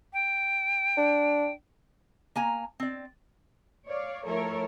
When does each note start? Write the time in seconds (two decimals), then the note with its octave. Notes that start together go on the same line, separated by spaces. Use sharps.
0.13 G5
0.97 D4
2.36 A#3 G#5 A#5
2.80 C4 D5
3.87 C#5 D5 F5
4.25 F3 A3 E4 A4 A#4 C#5